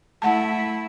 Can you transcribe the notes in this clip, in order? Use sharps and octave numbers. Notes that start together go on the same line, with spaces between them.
A3 E4 F#5 A5